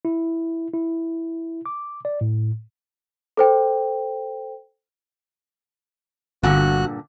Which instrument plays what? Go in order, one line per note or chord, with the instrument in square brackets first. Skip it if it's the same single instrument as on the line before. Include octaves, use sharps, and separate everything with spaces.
[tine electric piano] E4
E4
D6
D5
A2
[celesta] A4 C5 G5
[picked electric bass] G1 [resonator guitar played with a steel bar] G2 A#2 D3 [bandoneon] F#4 F#6